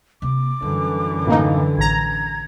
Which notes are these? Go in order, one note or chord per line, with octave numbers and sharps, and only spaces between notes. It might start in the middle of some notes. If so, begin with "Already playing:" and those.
C3 A#3 D6
F#2 D3 E3 G3
A2 A#3 D#4
A1 A#5 G#6